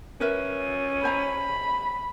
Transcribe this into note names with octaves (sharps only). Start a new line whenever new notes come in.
C#4 A#4 B4 E5
C5 G#5 A#5 B5